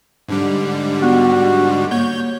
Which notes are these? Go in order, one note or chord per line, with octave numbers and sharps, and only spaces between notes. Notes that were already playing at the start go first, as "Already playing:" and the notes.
G#2 D3 G3
B3 F#4
A#3 C#5 G6